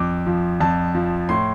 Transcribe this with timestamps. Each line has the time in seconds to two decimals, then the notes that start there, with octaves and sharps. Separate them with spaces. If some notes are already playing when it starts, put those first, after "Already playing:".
Already playing: F2 D6
0.27 F3
0.60 F2 A5
0.95 F3
1.29 A2 C6